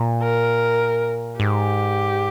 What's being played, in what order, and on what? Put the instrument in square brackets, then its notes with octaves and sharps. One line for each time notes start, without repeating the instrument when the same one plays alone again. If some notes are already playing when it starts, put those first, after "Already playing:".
Already playing: [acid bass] A#2
[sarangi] A#4
[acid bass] G#2 [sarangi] G4